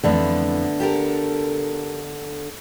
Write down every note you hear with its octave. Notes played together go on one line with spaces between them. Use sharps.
F2 D3 E3 F3 A3 B3
G4 A4 A#4